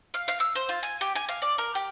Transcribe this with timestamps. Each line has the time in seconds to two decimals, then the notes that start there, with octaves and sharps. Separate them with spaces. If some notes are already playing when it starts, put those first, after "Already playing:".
0.14 F5
0.28 F5
0.40 E6
0.55 C5
0.69 F4
0.83 G#5
1.01 G4
1.15 G#5
1.29 F5
1.42 D5
1.58 A#4
1.75 G4